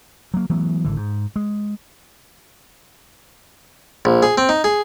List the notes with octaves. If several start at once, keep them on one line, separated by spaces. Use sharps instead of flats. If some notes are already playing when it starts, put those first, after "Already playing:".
F#3 A#3
E3 F#3 A3 B3
G#1 D3 E3
G#2
G#3
A#1
G#4
C4
D#4
G#4